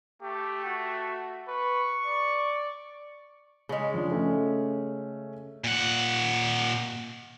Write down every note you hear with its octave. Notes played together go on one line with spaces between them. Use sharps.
A3 G4
F#4
B4 C#6
D5
C#3 G#3
F3 D4
A3 C#4
A#2 F#5